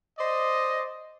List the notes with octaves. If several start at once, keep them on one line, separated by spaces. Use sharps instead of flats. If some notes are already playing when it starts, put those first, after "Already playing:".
C5 D5 D#5